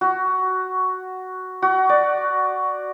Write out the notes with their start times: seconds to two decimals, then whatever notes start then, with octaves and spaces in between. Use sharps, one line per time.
0.01 F#4
1.62 F#4
1.89 D5